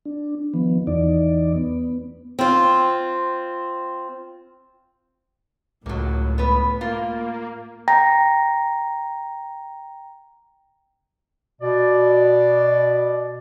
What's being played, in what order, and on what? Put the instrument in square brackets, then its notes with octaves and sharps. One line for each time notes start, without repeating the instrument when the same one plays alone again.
[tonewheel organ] D4
D#3 F3 B3
E2 E3 D#4 D5
B3
[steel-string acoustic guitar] C4 F4
[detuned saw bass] C#2 [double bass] A2 [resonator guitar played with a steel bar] F#3 A#3
[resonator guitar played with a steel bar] B3 B4
[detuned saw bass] A#3 [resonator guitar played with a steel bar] F4
[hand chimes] G5 A#5 A#6
[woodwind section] B2 D5